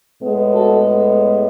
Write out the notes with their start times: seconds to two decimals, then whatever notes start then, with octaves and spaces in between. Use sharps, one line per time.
0.22 A2 G#3 B3
0.51 F#4 A4